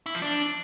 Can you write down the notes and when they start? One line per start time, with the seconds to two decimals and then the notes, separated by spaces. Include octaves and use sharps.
0.06 E4
0.14 F3
0.22 D4